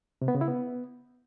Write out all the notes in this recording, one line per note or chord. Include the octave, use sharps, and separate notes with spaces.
C3
B3
C#3
E4
B3